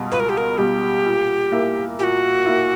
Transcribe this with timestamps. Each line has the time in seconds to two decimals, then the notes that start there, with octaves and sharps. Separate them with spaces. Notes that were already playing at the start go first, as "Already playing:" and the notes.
Already playing: C#2 B2 G3
0.12 C#2 B4
0.20 A#4
0.29 G4
0.37 A#4
0.58 B2 G3 G4
1.05 A#2
1.51 A#3 E4
1.99 A#2 F#4 G4
2.46 A#3 E4